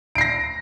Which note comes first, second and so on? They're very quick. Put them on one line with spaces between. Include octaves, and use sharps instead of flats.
D7 C7 A#6